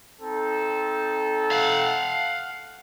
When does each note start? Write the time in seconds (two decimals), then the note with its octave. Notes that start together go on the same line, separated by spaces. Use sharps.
0.20 C4 D#4 A4
1.51 F5 F#5